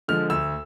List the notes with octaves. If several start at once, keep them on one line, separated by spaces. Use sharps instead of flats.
D3 F3 G#3 F6
D2 E6